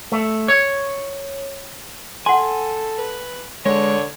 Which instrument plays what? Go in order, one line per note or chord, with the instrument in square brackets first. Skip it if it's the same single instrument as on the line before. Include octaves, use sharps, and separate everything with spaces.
[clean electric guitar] A3
C#5
[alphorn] A4 [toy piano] F#5 C6 [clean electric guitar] G#5
[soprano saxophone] B4
[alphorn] D3 [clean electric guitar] G#3 [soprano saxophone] C#5